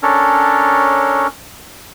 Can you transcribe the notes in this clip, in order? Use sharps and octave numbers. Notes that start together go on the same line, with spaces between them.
C#4 D4 A4 A#4 C#5